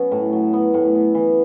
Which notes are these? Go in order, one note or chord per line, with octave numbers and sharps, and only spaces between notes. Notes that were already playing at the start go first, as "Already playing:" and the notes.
Already playing: F#3 B3 C#4
A2
F#3
B3
A2
B3
E3